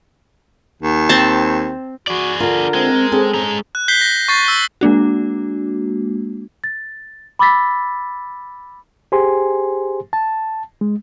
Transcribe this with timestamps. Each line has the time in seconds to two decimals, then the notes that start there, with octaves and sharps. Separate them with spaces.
0.83 D#2
1.09 C4 A5
2.07 F#4 G#4 D5
2.40 D3 F4 A#4
2.74 G#3 C4
3.12 C4 C#4 G#4 A4
3.34 G#3 A#5
3.75 F#6
3.88 G6 B6 C7 G7
4.01 A#6
4.28 C#6 A6 C7
4.45 E6 G7
4.81 G#3 A#3 D4 F#4
6.64 A6
7.39 B5 D6 E6 A6 B6
9.12 G4 G#4 C5 G#5 C6
10.13 A5
10.81 G#3